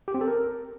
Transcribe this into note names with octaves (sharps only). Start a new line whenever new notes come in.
G4
C4
A4
A#4